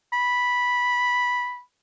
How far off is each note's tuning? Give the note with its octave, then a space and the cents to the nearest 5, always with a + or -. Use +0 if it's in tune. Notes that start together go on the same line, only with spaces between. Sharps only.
B5 -5